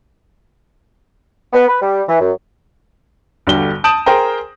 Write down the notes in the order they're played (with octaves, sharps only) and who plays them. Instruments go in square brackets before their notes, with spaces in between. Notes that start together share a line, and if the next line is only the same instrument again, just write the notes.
[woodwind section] B3
B4
G3
E3
F#2
[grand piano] G1 D3 G3 F#4 G7
A5 D#6 G6 D7 E7 F#7
G#4 A#4 C5 G5 A#5